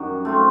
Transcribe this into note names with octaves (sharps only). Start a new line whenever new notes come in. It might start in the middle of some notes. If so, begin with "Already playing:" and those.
Already playing: F#2 D#3 G3
A3 C4 F4